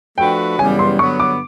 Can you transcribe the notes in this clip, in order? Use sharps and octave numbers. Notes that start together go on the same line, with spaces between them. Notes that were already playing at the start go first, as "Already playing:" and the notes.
F3 A3 D4 F#4 B4 G5
F#2 C#3 E3 G3 B3 G#5
C6
G2 D3 F#3 B3 C#6
D6